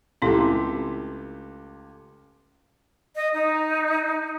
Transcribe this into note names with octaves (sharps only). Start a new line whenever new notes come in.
C#2 A3 C4 E4 G4
D#5
D#4